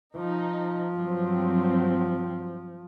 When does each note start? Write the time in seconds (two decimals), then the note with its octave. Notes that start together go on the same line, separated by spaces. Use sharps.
0.17 F3 D#4
0.93 G2 F#3 C4